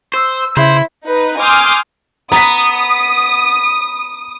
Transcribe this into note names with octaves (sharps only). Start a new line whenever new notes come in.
C5 E6
C#3 E4 C5
D#4 B4
G#5 C6 D6 D#6 F6 G6
B3 A#5 D#6 B6